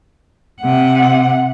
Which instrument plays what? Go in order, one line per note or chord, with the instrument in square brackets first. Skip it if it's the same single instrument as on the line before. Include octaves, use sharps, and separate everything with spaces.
[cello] C3 F#5